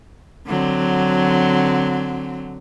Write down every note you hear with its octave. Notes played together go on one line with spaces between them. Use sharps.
D3 F#3 C4